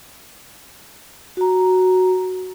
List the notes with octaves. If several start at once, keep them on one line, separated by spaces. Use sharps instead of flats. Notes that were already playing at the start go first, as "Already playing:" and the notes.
F#4 A#5